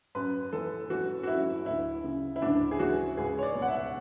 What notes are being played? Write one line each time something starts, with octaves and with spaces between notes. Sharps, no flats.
F#2 B4
E3 A4
E3 F#4
F#4
F#2 E4
D2 E4
C#3
E4
D2 D4
G#4
E3 F#4
C#2 G#4
C#5
D5
B2
F#5
E5